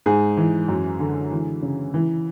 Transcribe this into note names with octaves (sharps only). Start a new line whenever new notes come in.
G#2 G#4
E3
F#2
D3
E3
C#3
E3